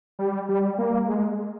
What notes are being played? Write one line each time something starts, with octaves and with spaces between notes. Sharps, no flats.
G3
G3
A#3
G#3